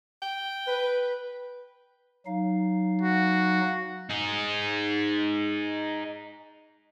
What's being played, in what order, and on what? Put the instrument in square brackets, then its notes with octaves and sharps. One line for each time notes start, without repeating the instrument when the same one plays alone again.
[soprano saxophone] G5
[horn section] B4
[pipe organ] F#3 D#4 F5
[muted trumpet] F#4
[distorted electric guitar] D#4 G#4